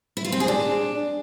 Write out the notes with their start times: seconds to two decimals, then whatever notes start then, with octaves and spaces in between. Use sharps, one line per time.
0.17 E4
0.25 F4
0.32 C4
0.40 G#4
0.48 D4